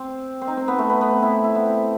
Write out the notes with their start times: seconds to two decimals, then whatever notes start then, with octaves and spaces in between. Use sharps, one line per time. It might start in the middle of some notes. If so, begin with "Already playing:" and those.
Already playing: C4
0.42 C4
0.47 D#4
0.57 C4
0.68 B3
0.79 A3
0.90 B3
1.01 B3
1.11 C4
1.22 E4
1.44 E4
1.55 B3
1.66 C4